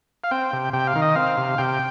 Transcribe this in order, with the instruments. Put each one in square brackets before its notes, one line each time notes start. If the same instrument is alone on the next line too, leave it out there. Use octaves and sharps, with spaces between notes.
[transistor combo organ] F5
C4 G5
C3
C3 G5
F5
D#3
D#5
C4 F5
C3
C3 G5